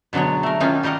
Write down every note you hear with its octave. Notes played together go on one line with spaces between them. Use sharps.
B2 D3 F#3 G#3 C#5
A3 A#4
D#3 A#3 C#4 D#4 F4
G3 G4 A#4 D#5 F#5